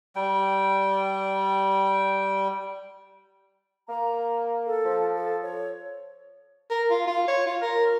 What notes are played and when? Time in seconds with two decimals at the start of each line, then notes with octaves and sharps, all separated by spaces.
0.16 G3 G5
3.88 A#3 A#5
4.66 A4
4.85 F3
5.17 A4
5.42 C#5
6.70 A#4
6.90 F4
7.07 F4
7.28 C#5
7.46 F4
7.62 A#4